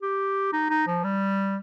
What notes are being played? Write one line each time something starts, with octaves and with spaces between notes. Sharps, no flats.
G4
D#4
D#4
F3
G3